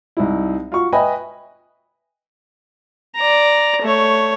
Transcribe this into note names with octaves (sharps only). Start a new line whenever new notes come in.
C2 D#4 E4
F4 F#4 C#6
B4 D#5 E5 G5 G#5 B5
D5 A#5
A3 C#5